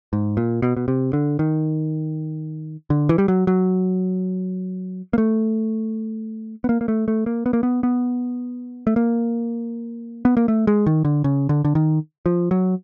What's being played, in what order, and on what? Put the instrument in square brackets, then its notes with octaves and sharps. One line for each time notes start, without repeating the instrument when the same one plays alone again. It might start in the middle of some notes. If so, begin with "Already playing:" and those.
[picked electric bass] G#2
A#2
B2
B2
C3
D3
D#3
D3
E3
G3
F#3
F#3
A#3
A3
B3
A#3
A#3
A3
A3
A#3
B3
A#3
B3
B3
A3
A#3
B3
A#3
A3
G#3
D#3
D3
C#3
D3
D3
D#3
F3
F#3